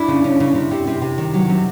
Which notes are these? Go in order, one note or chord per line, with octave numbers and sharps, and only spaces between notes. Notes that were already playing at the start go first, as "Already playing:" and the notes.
Already playing: D4 E4
C#3
C#3
C#3
C3
C3
C3
C3
D#3
F#3
C3